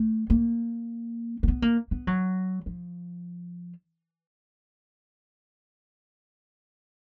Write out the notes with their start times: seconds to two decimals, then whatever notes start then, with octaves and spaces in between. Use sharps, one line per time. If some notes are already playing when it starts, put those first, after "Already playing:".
Already playing: A3
0.30 A#3
1.43 A#3
1.48 B3
1.62 A#3
1.91 B3
2.07 F#3
2.66 F3